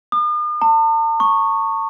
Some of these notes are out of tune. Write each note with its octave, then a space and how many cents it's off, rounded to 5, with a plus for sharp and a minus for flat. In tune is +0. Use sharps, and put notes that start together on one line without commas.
D#6 -45
A5 +40
C#6 -10